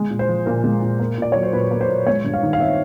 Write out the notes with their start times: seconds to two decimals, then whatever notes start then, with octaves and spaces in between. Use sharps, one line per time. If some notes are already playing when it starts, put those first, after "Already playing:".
Already playing: G#3
0.10 A#2
0.19 C5
0.28 F3
0.46 A#2 A#4
0.64 G#3
0.82 A#2
0.99 A#3
1.18 A#2 D5
1.32 F#3 C#5
1.43 C5
1.53 A#2 B4
1.71 A#3
1.81 C5
1.89 A#2
2.07 G#3 C#5
2.24 G2
2.34 F5
2.42 D#3
2.53 F5
2.60 C4 E5